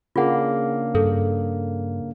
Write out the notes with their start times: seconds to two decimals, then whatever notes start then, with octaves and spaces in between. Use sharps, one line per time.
0.16 C#3 A#3 D4 F4 G#4 F#5
0.95 G2 A4